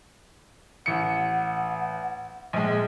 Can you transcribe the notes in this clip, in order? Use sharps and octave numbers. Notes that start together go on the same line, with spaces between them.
A1 F#5 C#7
A#1 G#3